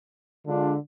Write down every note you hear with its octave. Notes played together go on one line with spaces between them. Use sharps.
D3 G#3 D4 F4